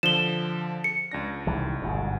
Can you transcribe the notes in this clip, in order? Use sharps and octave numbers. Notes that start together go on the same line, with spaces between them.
D3 F3 E7 G7
C#7
C#2 D4 A#6
C2 D#3 E3
G1 G#2 B2